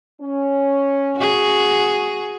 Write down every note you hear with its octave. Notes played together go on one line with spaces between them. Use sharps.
C#4
F#4 G#4